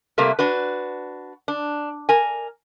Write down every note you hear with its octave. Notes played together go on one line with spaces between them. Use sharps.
C3 G3 A3 A#3
D4 F#4 B4
D4
A#4 G#5